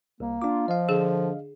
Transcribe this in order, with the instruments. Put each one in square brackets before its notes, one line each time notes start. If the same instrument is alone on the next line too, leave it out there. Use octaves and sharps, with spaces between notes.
[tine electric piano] C2 [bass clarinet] A#3
[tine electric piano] D4 D6 [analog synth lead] F4
[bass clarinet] F3 [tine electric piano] D#5 F5
[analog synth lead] D3 [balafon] G#4